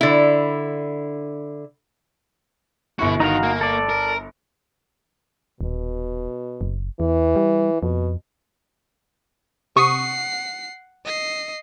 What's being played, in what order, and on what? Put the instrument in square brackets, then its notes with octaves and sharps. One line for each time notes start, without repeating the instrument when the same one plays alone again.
[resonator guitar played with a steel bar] D3 E4
[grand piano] G1 E4 C#6 [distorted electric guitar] B2 F#4
[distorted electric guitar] D#3 [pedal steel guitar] D#4 F#4 F5
[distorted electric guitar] A#3
[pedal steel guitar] A4 D5
[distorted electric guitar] A#4
[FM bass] D#1 [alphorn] B2
[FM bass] F#1
[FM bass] E2 [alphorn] E3
[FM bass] G3
[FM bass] F2 [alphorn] B2
[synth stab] C3 C#6 D#6 [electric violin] F#5 C7
[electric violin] D#5 C7